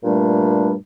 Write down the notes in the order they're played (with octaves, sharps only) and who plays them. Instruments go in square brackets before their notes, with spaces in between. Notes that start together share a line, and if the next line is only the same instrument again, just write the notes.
[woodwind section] G2 A#2 G3 A3 D4